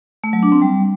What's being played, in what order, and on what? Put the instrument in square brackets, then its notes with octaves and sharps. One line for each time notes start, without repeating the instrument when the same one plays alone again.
[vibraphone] A3
F#3
D4
C4
G3